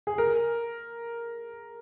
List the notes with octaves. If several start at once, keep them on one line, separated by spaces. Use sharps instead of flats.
G#4
A#4